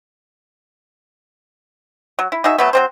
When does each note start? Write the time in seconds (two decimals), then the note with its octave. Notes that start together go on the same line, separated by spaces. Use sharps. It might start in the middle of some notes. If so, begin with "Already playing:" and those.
2.19 F#3
2.32 E4
2.44 D#4 F#4 G#4 E5
2.58 F#3 A3 B3
2.73 F#3 C4 C5